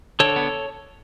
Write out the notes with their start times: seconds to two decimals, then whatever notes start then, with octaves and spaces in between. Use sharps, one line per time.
0.20 D3 A4 C#5
0.36 B3